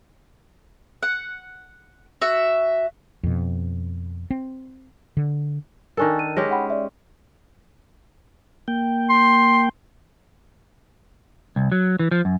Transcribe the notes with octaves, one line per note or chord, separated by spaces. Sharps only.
F#5
F#4 E5
F2 B2
C4
D3
D#3 D4 A4 A#4 G#5 C#6
D#7
G#3 C#4 G4 A#6
F#5 G5 B5
D5 E5
A#3 G5
C6
C2
F#3
E3
F3
F#2